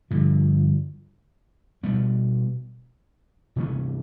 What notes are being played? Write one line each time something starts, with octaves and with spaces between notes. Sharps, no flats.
G2 D3 F3
B2 G3 B3
C3 E3 A3 C#4